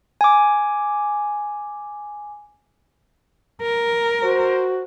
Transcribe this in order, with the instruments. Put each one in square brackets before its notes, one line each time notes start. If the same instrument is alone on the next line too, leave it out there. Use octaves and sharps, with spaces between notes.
[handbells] G#5 D6
[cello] A#4
[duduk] F#4 [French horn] C5